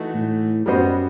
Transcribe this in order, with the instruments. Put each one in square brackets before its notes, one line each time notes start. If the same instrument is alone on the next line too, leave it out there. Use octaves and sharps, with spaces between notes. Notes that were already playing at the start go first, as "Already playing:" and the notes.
Already playing: [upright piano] E3 A3 D#4 F#4
[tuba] A2
[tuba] F#2 [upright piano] G3 B3 F#4 C5 D#5